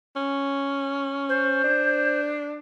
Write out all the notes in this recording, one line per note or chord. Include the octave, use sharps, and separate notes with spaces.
C#4
C5
D4